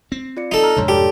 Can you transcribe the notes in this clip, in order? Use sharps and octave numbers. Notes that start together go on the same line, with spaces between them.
C4
F4 D5 C#7
D#4 A4
A#5 E6 F6
F2 G#2 C3 D4 C#5 C6
G4 A4 D5 A5